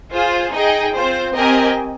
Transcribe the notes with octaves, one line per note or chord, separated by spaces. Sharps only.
F4 G#4 C5
D#4 G#4 D#5 G5
C4 F4 C5
C4 G4 A#4 D#5 G#5